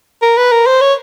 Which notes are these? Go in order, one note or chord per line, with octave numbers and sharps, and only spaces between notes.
A#4
B4
A#4
C5
C#5